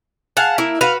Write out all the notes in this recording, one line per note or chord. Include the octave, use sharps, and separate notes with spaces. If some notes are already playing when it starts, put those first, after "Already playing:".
G#4 F5 F#5 A5
A#3 E4
F#4 B4 F5